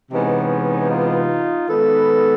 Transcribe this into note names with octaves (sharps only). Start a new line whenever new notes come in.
C3 E3 G#3 B3 C#4 D#4
D#4 F4
D#3 G#3 B3 A4 B4